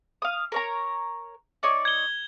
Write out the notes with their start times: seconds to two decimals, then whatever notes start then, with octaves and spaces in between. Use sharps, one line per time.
0.22 F5 D#6
0.52 A#4 C#5 A#5
1.63 D#4 C#5 D5
1.85 G#6 G7